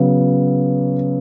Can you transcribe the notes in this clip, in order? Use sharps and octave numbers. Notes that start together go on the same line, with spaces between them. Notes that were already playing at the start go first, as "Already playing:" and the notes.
Already playing: C#3 F#3 B3